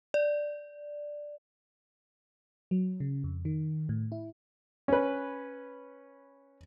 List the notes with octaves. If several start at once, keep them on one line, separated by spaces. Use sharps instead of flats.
D5
F#3
C#3
F2
D#3
A2
E4
C#4 B4